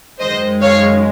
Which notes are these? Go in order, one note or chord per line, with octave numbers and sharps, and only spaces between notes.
F#2 D#3 G#3 C5 D#5
C#5 F5